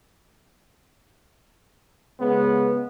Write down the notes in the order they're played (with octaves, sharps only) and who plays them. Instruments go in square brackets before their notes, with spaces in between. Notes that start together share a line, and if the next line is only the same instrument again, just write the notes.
[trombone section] C#3 G#3 B3